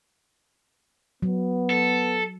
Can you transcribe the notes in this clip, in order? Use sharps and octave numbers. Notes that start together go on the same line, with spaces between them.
F#3 B3
A4